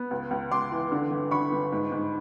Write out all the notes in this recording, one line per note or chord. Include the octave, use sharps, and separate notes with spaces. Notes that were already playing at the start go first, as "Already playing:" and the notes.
Already playing: B3
C#2
C#2
C#2 C6 D6
E3
D3
G1
D3 B5 C#6
G1
G#2
G#2